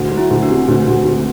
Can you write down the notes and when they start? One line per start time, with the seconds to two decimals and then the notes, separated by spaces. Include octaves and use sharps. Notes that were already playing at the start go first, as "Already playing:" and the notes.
Already playing: D2
0.12 F#3
0.17 E4
0.30 D2
0.43 D4
0.49 C3
0.68 D2
0.87 D2
1.05 D2